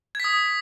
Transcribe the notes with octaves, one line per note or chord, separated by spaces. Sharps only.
D#6 G#6 B6